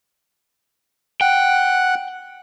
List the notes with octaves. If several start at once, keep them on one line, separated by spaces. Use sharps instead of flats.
F#5 G5